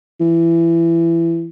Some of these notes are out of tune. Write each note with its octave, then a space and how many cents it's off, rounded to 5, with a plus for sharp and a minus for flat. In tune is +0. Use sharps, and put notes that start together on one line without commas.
E3 +20